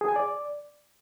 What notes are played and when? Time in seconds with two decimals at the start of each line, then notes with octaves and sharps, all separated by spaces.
0.01 G#4
0.08 G#5
0.16 D5